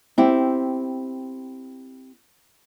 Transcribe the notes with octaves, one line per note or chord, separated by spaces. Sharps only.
C4 E4 G4